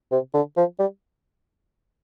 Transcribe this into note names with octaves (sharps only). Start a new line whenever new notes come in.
C3
D3
F3
G3